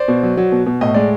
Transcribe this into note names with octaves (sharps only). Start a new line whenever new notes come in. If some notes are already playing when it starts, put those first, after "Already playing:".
Already playing: C5 D5
B2
F#3
F#3
B2
B2
A2 D#5
G#3 D5